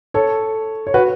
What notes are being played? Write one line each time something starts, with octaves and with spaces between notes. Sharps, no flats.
A4 C#5
C#5
F#4 B4